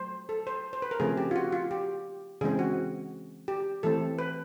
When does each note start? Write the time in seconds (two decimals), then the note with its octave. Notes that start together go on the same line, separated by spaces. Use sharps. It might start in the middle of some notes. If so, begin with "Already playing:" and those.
Already playing: F#3 A3 C5
0.29 A4
0.47 C5
0.73 C5
0.82 B4
0.91 A#4
1.00 C#3 F3 A3 C4 G#4
1.18 G4
1.31 F4
1.36 F#4
1.52 F4
1.71 G4
2.41 C#3 E3 G#3 C4 G#4
2.59 F#4
3.48 G4
3.83 E3 A3 C4 A4
4.19 B4